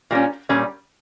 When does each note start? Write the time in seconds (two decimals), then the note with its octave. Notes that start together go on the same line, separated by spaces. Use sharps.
0.11 A#2 G3 C#4
0.49 A#2 G3 C#4